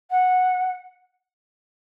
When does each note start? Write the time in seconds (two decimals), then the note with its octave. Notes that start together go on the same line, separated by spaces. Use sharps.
0.10 F#5